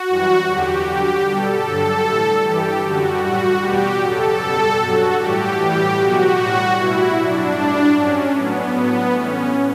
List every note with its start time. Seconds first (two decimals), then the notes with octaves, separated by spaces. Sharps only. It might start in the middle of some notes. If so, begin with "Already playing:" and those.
Already playing: F#4
0.08 F#2 E3 G3
0.48 E2 D3 F#3 G4
0.87 G2 D3 G3 G4
1.26 B2 G3 A4
1.66 G2 D3 F#3
2.05 A2 E3 G3
2.44 G2 E3 G3 G4
2.84 F#2 D3 G3 F#4
3.23 A2 G3 F#4
3.62 E2 B2 G3 G4
4.01 F#2 C#3 F#3 A4
4.42 B2 G3
4.80 G2 F#3 F#4
5.19 A2 E3 G3 G4
5.59 A2 E3 G3 G4
5.98 B2 F#3 F#4
6.38 A2 G3
6.77 B2 G3 E4
7.16 G2 F#3 D4
7.56 A2 G3
7.95 G2 F#3 C#4
8.34 A2 F#3 B3
8.73 A2 F#3 B3
9.12 A2 E3 G3 C#4